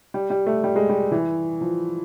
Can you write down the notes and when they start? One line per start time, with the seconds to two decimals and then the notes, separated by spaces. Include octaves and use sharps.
0.14 G3
0.30 G3
0.47 A3
0.64 G3
0.76 G#3
0.89 G3
1.12 E3
1.61 F3